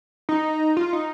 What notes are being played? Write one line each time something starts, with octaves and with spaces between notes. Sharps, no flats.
D#4
F4
D#4